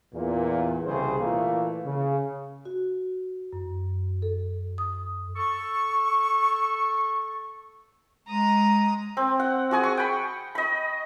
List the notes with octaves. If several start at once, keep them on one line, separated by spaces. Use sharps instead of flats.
E2 A#2
C2 C#3 G#4 C5
A#2 E3 A3 A#3
C#3
F#4
F#2
A4
D#6
A4 C#6
G#3 A#5 D#6
C4
F#5
F#4 G#4 G#5 D#6
C#6
G5 B5
D#5 B5